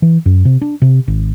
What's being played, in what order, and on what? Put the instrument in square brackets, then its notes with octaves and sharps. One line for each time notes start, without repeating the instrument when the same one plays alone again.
[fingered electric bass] E3
F#2
C3
D4
C3
G#1